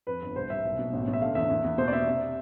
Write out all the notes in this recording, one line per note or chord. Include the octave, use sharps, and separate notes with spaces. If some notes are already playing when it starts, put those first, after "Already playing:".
F2 B4
G1
C2 C5
C2 E5
B1
B2
A1
A1
E5
D3 F5
E2 E5
E2
E2
B2 C5
D5
B2 E5
C3